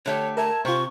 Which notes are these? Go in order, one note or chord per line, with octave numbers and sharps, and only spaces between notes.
D3 A3 G4 C#5
A#4 E5 A5 G#6
C3 C4 F4 C#6